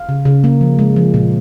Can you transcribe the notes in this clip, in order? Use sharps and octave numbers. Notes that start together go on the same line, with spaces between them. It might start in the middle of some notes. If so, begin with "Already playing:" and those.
Already playing: F5
C#3
C#3
A#3
F3
G#3
F3
A#2